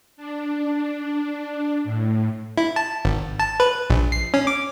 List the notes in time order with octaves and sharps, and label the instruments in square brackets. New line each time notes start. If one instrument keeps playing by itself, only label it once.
[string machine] D4
A2
[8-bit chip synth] E4
A5
G#1
A5
B4
A#1
C7
C#4
D6